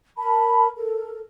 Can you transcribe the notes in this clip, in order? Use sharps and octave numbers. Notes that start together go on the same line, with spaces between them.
A#4 A5 B5
A4 A#4